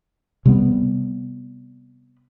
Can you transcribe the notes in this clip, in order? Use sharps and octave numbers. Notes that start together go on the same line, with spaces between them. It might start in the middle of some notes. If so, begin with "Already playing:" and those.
C3 G3 B3